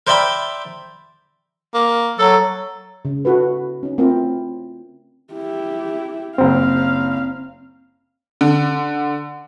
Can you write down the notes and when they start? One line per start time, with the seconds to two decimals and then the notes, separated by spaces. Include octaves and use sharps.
0.07 A#4 C5 D5 E5 G5 B5
1.74 A#3
2.19 F#3 A4
3.05 C#3
3.25 E4 F#4 A4 B4
3.83 C#4 D#4
3.98 A3 C4 E4 F4 A#4
5.33 E4 G4
6.38 F#1 C4 C5 F5
8.41 D3